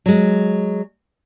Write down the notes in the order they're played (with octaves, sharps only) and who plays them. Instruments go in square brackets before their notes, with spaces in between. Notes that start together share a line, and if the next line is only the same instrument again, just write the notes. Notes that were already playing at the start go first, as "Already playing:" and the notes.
[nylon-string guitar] F#3 G#3